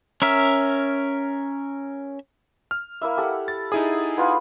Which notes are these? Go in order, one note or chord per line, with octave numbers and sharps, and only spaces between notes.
C#4 A#4 E5
F6
A#3 E4 E5
G4 A4 F#5
A6
D#4 E4 G#4 D#6
B3 F4 B5